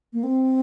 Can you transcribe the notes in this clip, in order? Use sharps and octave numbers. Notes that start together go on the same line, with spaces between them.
A#3
C4